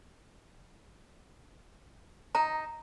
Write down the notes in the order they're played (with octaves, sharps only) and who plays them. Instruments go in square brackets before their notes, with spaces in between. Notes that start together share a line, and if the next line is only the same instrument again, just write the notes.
[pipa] D#4 [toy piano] A#5